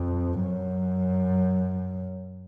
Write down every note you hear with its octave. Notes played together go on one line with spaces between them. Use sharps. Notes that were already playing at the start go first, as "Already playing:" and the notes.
Already playing: F2
F#2